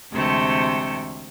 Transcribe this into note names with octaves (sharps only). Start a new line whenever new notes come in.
D2 C3 E3 G#3 A3 C4